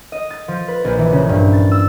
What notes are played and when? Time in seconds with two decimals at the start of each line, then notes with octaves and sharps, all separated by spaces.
0.12 D#5
0.30 A6
0.48 F3
0.68 B4
0.84 A#1
0.98 E3
1.12 C#3
1.29 G2
1.53 A6
1.72 E6